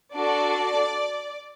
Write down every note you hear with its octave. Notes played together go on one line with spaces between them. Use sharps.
D4 F#4 A4 D5